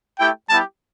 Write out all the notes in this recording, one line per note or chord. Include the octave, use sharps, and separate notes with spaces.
A3 E4 G4 G5
G3 B3 E4 G4 A5